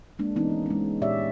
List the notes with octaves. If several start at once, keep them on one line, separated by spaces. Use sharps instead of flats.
G#3 A#3 D4
E3 B3 C#4 D#4
B3
G#3 C#4
A#2 G4 C#5 D5 E5